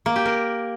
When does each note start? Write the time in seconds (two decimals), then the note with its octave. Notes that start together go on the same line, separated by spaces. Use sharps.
0.06 A#3
0.16 G4
0.25 A#4